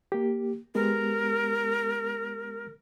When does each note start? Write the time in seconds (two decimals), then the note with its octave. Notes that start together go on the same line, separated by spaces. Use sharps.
0.12 A#3 G4
0.75 G#3 B3 G4 A#4